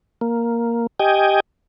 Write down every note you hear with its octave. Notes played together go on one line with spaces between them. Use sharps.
A#3
G4 D#5 G5 G#5